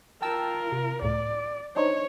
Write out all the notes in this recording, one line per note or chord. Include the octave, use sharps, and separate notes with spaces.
F4 A#4 G5 A5 E6
C3
C#2 A2 D5
D4 D#4 C5 C#5